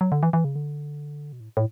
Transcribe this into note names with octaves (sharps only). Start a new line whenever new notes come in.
F#3
D3
E3
E3
C#3
D3
B2
A2
A2